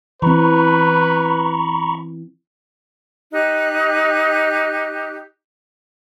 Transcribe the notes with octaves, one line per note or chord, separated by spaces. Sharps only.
E3 C4 B4 A#5 B5 C#6
D#4 G4 F#6